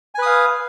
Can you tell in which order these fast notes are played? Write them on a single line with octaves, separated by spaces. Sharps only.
G#5 B4 D#6 F5